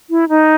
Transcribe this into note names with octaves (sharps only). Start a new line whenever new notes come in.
E4
D#4